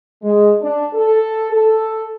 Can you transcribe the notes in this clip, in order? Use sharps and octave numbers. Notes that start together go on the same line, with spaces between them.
G#3
D4
A4
A4